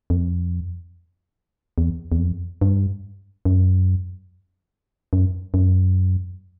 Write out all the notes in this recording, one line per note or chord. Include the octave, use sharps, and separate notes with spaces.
F2
E2
E2
F2
G2
F#2
F#2
F#2